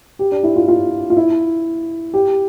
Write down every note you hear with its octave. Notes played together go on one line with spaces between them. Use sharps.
G4
D4
E4
F4
F4
F4
E4
G4